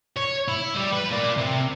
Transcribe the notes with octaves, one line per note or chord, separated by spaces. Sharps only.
C#5
E4
G3 G4
B4
A#3 D5
C3